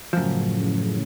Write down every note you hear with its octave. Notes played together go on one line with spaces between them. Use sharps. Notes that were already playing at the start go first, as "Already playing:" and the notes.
F#2 A2 C#3 F3